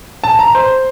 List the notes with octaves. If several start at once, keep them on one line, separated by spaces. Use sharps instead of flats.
A5
A#5
C5